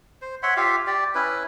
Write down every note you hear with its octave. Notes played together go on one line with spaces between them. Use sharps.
C5
C#5 E5 F#5 C6
F4 G4 E5 F5
G4 D5
C#4 E4 B4